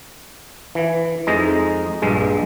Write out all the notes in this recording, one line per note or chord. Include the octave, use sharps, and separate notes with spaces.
E3
F2 G#3 D#4 A#5
A#1 G2 G#3